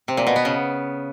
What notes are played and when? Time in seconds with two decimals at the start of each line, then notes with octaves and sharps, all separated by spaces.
0.08 C3
0.17 A#2
0.27 B2
0.36 B3
0.45 C#3